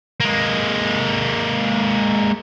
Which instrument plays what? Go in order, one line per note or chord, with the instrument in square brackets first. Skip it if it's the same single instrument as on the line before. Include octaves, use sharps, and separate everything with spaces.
[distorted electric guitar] G#3 A#3